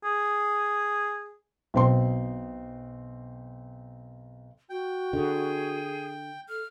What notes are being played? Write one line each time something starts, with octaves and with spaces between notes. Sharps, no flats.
G#4
B1 C4 C6
F#4 G5
D3 G#4
A4 F6